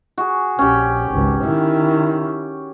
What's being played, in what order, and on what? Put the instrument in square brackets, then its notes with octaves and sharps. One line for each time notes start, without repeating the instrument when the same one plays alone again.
[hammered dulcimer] F#4 G#4
[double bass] A#1 [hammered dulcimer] C#4 G4
[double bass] G#1 C#2
D#3 E4